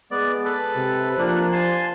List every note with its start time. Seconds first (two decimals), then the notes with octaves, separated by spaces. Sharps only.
0.11 G#3 B3 D5
0.45 A4 B4
0.76 C3
1.18 F3 A#3 D4 F#6
1.52 G#5 A5 C6